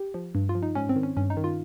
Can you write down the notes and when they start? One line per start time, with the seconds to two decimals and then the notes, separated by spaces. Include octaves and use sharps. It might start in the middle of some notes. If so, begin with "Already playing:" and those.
Already playing: G4
0.14 F3
0.35 G2
0.49 F4
0.55 F3
0.63 D#4
0.75 G#2 C#4
0.89 C4
0.96 D#3
1.03 C#4
1.17 G2 C#4
1.30 D#4
1.37 D#3
1.44 F4